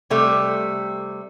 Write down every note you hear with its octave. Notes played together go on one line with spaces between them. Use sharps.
C3 G3 A3